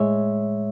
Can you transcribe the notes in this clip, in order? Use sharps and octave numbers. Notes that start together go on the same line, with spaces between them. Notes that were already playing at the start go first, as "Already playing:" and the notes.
Already playing: A2 G#3 C#5 E5